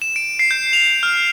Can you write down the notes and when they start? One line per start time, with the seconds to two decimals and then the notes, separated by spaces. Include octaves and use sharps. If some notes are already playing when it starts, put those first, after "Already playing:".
0.02 E7
0.16 D7
0.39 C7
0.51 G6
0.73 F7
1.03 F6